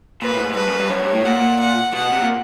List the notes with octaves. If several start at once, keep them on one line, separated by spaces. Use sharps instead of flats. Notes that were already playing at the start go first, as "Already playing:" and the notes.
A#2 B4
A2
G#2
G#2
G2 B4
F#2
G2
F#2 C#5
G2
A2
A#2 F#5
F#5
B2 F#5
C3
A#2